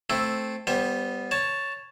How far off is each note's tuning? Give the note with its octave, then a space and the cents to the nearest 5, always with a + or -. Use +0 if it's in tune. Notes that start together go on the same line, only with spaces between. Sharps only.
A3 -5 C4 +0 E4 +0
G3 +0 B3 +0 C5 +30
C#5 +0 A5 +0